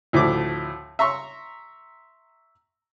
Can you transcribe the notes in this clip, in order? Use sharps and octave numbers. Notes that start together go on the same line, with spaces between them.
D2 A2 F3 A3 D6
E5 A#5 C6 C#6